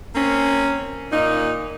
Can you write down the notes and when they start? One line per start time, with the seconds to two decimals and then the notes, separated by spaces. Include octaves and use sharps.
0.15 A#3 C4 C#4
1.11 A#2 D#4